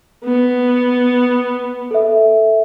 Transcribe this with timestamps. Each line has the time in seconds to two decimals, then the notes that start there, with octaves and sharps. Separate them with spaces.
0.24 B3
1.91 A4 E5